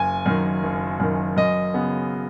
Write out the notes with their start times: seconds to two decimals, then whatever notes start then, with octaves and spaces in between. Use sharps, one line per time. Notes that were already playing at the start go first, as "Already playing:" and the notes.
Already playing: F#1 G#5
0.26 F#2 D#3
0.63 F#1
1.00 F#2 D#3
1.37 F#2 D#5
1.74 C#3 B3